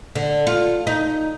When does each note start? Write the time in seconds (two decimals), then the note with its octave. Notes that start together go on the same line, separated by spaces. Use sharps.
0.15 D3
0.47 F4
0.87 D#4